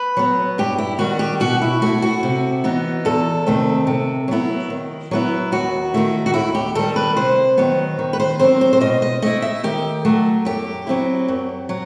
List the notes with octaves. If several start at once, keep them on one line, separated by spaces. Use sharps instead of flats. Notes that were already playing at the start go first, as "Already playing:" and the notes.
Already playing: B4
F#3 B3
G2 G4
E4
D#3 G3 F#4
G4
B2 F#4
E4
A3 E4 F#4
F#4
C3
E3 B3 D#4
E2 A4
C3 D#3 A3 C4
C3
F#3 B3 E4
D#3
F#3 B3 E4
D#2 F#4
D#3 A3 E4
F#4
D#2 E4
G4
D#3 G3 A4
B4
C3 C5
D#3 F#3 B3
D#3
B4
C5
F#3 C4 C5
C5
C5
B2 D#5
D#5
A3 E4 D#5
E5
D#3 G4
F#3 A3
F#2 G4
F#3 C4 E4
F#2
F#3